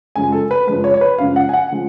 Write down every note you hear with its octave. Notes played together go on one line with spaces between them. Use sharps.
F#2 C#3 F3 G#3 G#5
A4
B4
F#2 C#3 F3 G#3 B4
C#5
C#5
B4
F#2 C#3 F3 G#3 F5
F#5
G#5
F#5
C#3 F3 G#3